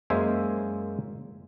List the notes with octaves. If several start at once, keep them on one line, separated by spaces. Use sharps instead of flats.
F#2 G#3 A#3 C5 E5 G#5